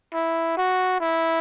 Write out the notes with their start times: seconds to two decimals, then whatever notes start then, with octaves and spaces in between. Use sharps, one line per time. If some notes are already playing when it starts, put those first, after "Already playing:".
0.14 E4
0.57 F#4
1.00 E4